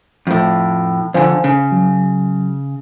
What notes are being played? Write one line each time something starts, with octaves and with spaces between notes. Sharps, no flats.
F2 A2
F2 D3 C5 F5 G#5
C#3
F#3